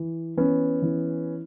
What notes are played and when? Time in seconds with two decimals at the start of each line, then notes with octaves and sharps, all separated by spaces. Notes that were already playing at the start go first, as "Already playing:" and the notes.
Already playing: E3
0.37 E3 B3 C#4
0.82 E3